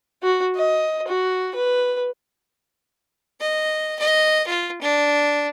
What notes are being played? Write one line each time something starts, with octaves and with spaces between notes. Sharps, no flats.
F#4
D#5
F#4
B4
D#5
D#5
F4
D4